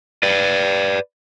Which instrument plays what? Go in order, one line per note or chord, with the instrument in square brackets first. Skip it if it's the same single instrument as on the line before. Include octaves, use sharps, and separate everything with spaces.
[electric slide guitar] B4 D5